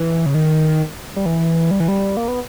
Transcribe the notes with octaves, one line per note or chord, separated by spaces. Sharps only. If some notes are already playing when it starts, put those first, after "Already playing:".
Already playing: E3
C#3
D#3
G3
E3
G3
E3
G3
A#3
B3